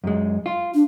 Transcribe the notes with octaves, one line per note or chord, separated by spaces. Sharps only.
F#2 G#3
F4
D4